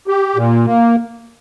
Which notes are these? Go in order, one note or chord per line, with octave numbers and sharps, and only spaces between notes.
G4
A#2
A#3